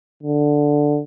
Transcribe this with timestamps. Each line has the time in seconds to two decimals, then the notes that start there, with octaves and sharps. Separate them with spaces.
0.23 D3